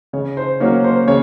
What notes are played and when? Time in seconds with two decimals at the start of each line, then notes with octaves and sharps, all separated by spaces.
0.13 C#3 C#5
0.37 C5
0.60 F#3 A#3 C#4 C#5
0.84 C5
1.07 C#3 C#5